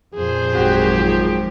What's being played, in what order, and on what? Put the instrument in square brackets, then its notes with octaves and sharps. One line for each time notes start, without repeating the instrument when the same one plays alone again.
[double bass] F2 A#2 [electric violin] G#4 C5
[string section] G#1 F#3 G4 [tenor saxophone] F#4
[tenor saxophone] F3